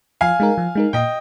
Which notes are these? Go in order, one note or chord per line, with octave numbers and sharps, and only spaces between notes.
F3 F5 G#5
G#3 D#4 A#4
F3
G#3 D#4 A#4
A#2 D#5 G5